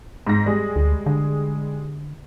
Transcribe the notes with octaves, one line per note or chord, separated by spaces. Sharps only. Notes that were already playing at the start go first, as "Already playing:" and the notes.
G#2 A#6
G3 G#3 G#4
D2
D3